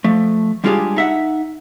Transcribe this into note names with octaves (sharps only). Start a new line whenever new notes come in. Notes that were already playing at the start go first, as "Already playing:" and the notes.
F3 A3
G3 G#3 D4 F4 G4 G#4
D#4 E5 F#5